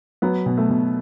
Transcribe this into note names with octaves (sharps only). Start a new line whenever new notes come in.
F#3 B3
B2
A3
B2